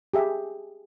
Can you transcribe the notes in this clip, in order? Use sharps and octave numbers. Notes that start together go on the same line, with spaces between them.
G4 G#4 E5 F5